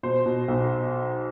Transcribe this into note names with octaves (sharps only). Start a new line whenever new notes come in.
B2 C5
B2
B1